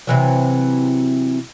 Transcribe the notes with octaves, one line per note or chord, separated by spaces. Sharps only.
C3 E3 F#3